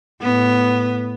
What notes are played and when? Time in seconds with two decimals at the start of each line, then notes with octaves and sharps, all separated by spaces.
0.21 A2 B3